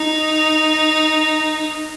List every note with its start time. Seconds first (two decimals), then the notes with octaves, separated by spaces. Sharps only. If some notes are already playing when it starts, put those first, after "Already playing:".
Already playing: D#4